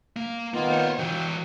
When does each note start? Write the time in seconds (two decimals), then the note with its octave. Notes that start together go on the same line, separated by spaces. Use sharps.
0.16 A#3
0.54 D#3 A#3 B3 F4
0.70 C5 C#5
0.98 E3 F#4 G5